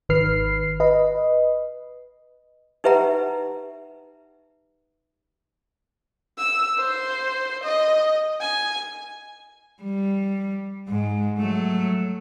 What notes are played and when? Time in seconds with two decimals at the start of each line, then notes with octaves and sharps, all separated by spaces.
0.09 G#1 D#3 B4 F6 C7
0.80 B4 D#5
2.84 D#4 G4 B4 E5 F#5 A#5
6.38 E6
6.78 C5
7.64 D#5
8.41 G#5
9.83 G3
10.88 G#2
11.38 F#3 A3